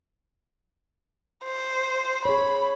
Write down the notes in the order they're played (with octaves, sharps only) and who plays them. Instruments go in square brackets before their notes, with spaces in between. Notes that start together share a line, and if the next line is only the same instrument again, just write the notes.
[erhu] C5
[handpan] G#4 C#5 [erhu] B5